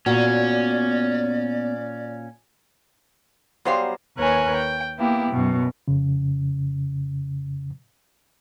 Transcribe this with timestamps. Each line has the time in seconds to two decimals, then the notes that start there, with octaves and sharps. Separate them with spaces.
0.06 A#2 B3 C#4 F#4 D5
3.65 F#3 G3 B3 G4 C5 F5
4.16 D#2 A#4 B4 C#5 G#5 F#6
4.57 G5
4.98 A#3 B3 E4 G4
5.32 F#2 B2
5.88 F2 C#3